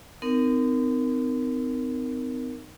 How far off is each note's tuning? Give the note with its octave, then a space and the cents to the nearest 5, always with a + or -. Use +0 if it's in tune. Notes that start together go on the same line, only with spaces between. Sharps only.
C4 -45 D#4 -20 A#4 -5